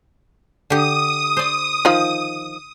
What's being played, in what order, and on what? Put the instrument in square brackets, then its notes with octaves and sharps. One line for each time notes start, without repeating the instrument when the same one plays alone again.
[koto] D3 G4 [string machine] D#6
[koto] C5 D5
[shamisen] D#3 F3